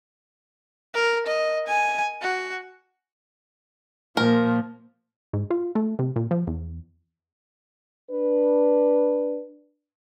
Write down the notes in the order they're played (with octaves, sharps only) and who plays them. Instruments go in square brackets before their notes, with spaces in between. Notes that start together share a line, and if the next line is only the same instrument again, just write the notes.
[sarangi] A#4
D#5
G#5
F#4
[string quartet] A#2 F3 [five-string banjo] A#4
[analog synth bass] G#2
F4
A3
C3
A#2
F3
E2
[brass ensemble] D4 B4